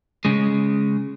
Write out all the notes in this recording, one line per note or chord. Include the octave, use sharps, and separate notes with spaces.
C#3 G#3